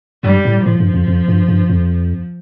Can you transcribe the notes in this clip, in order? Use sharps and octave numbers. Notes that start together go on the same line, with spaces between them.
G2 G3
A2
A2 F3
G2
F2
F2
G2
G2
F2